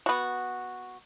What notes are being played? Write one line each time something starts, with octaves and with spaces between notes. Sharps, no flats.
B3 F#4